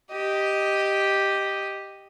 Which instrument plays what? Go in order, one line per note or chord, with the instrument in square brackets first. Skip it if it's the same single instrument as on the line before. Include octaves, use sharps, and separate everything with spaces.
[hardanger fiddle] G4 D#5